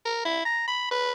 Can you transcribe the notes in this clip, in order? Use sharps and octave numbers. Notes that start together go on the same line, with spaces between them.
A#4
E4
A#5
B5
B4